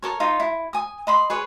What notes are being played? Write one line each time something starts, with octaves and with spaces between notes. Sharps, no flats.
A4 A#4 C#5
D#4 F4 F5 A#5
E4
G#5 D#6
D#5 B5 C6
G#4 B4 C#5